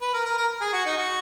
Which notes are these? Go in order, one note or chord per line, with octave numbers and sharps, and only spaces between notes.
B4
A#4
A#4
A#4
G#4
F#4
D#4
F#4